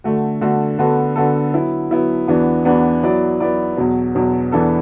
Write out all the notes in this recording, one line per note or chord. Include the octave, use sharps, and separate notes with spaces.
D3 A3 F#4
D3 A3 F#4
D3 B3 F#4 A4
D3 B3 F#4 A4
F#3 B3 E4
F#3 B3 E4
E2 E3 B3 D4 F#4
E2 E3 B3 D4 F#4
F#3 B3 E4 D5
F#3 B3 E4 D5
E2 B2 F#3
E2 B2 F#3
E2 E3 B3 D4 A4